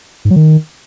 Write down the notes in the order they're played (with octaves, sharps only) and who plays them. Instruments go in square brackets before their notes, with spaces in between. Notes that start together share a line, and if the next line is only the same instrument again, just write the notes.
[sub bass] G#2
F#3
D#3